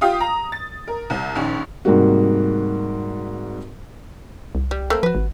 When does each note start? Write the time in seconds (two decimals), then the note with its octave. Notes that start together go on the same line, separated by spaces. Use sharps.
0.01 F4 G4 F5 D#6
0.20 A#5
0.52 A6
0.88 A#4
1.10 C2
1.35 A#1 D#3 C#4
1.85 G#2 C3 G3 A#3 F#4
4.55 C2
4.71 G3
4.90 A3 A#3 C4
5.03 F3 F#4 B4
5.15 G#1